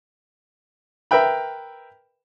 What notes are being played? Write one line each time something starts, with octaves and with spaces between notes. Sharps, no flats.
A#4 B4 E5 G5 B5